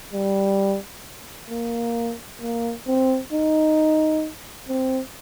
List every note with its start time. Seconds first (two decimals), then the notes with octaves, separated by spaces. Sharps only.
0.14 G3
1.50 A#3
2.41 A#3
2.87 C4
3.33 D#4
4.69 C4